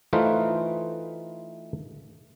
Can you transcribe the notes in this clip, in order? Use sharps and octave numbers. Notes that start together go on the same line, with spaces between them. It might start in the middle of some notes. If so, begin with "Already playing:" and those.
E3 A3 D#4 F4 B4 C5